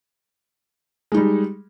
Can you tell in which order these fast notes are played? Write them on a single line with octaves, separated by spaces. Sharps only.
G#3 D#4 G3